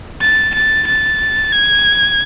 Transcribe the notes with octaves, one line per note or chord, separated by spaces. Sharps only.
A6
A6
A6
G#6